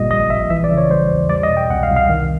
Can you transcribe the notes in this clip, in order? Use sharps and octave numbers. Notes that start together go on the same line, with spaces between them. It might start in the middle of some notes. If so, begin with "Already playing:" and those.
Already playing: G1 A#2 G3 D#5
A#1 D#5
A#1 E5
E3 E5
D5
C#3
C#5
G3 C5
E2
G3 D5
D#5
B2
G5
C2 F#5
F5
C2
F5
D#3